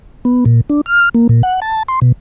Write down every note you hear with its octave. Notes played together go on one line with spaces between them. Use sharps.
B3
A#2
D4
F6
A#3
A#2
F#5
A5
C6
B2